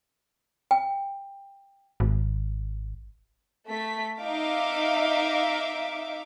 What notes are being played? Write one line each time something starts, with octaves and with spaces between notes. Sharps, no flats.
G5
G#1
A3 B6
D#4 E5 F5 D6